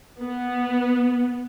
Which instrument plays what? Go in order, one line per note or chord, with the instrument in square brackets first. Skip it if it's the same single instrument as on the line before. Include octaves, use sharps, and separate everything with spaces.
[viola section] B3